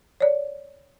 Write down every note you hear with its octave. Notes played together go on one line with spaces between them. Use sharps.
C#5 D5